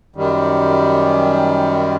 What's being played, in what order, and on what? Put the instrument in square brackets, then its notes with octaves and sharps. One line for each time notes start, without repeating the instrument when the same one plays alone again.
[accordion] F#2 D#3 G3